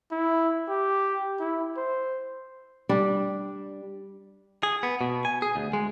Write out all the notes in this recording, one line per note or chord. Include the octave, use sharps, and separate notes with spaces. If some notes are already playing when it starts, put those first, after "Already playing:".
E4
G4
E4
C5
G3 D4
G#4
B3
B2
G#5
G#4
D2
G#3